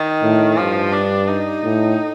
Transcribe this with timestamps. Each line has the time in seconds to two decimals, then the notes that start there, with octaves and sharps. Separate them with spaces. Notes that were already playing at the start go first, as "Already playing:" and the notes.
Already playing: D#3
0.23 A2
0.57 G2 F3
0.92 D4
1.28 D#4
1.64 A2